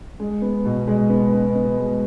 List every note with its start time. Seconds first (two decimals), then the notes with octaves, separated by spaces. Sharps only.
0.20 G#3
0.42 B3
0.65 B2
0.87 G#3
1.10 B3
1.33 B3
1.55 B3
1.78 G#3